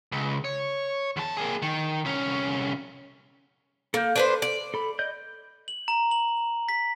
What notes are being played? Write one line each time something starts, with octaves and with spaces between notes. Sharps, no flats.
C#2
C#5
E2 A5
A#3 G#4
D#3
C2 C#4
A#3 A4 G6
D4 B4 C5
D5
A4 B5
D5 D#5 G6
F#7
A#5
F#7
B6